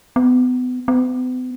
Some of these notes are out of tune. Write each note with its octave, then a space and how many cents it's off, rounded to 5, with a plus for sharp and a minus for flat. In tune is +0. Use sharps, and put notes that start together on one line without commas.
B3 +30
B3 +45